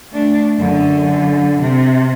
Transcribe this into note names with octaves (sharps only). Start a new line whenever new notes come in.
A3 D4
F#2 D3
C3